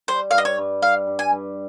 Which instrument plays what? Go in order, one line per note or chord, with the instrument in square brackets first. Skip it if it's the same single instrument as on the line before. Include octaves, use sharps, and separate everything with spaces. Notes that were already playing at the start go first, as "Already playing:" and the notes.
[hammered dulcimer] G3 [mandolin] C5
[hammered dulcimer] G2 [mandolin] F5
[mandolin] D#5
C#5
[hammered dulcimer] G2
[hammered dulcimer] G2 [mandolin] F5
[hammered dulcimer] G2
[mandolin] G#5
[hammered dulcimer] G2